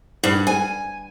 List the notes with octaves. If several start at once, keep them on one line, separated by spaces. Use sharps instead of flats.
G2
G#5